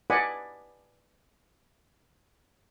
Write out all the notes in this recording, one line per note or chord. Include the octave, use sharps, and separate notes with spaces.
B4 D5 D#5 F#5 G#5 B5